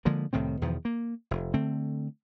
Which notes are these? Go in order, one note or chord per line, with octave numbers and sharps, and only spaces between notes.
D3 F3 G#3 A#3
C2 A2 D#3 C4
E2 B2 D#3 F3
A#3
F1
D3 A3 C4